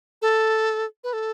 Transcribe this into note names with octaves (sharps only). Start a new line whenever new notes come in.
A4
B4
A4